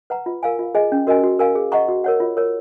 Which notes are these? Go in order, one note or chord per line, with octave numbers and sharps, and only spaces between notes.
B4 F#5 A#5
F4
A#4 F5 G#5
F4
G#4 D#5 G#5
C#4
F#4 A#4 D#5 G#5
F#4
A#4 F5 G#5
G#4
D#5 F#5 A#5 C#6
F#4
A#4 C#5 F#5
F4
A#4 C#5